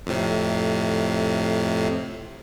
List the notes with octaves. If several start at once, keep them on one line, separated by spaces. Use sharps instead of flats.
F2 A2 C3